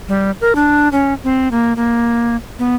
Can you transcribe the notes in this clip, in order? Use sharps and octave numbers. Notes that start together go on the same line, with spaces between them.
G3
A#4
D4
C#4
C4
A#3
A#3
B3